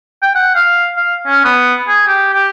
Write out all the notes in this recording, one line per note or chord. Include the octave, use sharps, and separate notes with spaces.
G5
F#5
F5
F5
C#4
B3
G#4
G4
G4